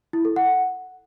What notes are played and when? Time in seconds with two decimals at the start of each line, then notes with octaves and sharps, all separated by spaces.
0.13 E4
0.25 A4
0.36 F#5